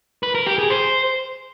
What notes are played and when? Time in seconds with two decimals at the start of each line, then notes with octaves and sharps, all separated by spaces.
0.23 B4
0.35 A#4
0.46 G4
0.58 G#4
0.70 C5